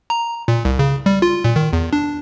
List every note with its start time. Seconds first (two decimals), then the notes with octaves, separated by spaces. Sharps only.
0.10 A#5
0.48 A#2
0.65 C2
0.79 C#3
1.06 G3
1.22 F4
1.45 A#2
1.56 D#3
1.73 E2
1.93 D4